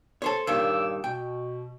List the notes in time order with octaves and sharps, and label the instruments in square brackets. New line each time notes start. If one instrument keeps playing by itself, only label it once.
[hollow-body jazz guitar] A4 C5 C#5
[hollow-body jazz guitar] G2 A#2 D#3 [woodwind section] C#5 D6 E6
[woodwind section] B2 [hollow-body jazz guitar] G5